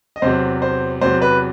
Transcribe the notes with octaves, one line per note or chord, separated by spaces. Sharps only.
D#5
E2 C3 F#3 C5
C5
E2 C3 F#3 C5
B4